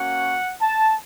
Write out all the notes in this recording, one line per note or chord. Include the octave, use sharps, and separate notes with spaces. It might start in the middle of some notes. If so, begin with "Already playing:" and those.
Already playing: A#3 C#4 F#4 F#5
A5